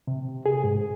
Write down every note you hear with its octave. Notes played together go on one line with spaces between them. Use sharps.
C3
G#4
G#2